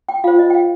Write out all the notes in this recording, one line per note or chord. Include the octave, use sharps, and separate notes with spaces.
G5
F4 C5 F5
D#5
G5
F5